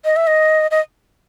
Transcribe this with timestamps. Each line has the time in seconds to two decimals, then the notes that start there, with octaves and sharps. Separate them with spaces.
0.05 D#5
0.16 E5
0.27 D#5
0.71 D#5